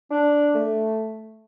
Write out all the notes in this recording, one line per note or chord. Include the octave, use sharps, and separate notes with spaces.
D4
A3